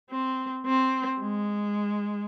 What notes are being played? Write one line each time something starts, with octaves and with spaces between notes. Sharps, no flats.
C4
C4
G#3